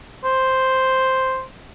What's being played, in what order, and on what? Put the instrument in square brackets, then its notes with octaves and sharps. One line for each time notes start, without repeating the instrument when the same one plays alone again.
[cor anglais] C5